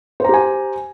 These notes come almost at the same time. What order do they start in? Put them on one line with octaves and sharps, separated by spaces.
C5 A#5 G4 G#5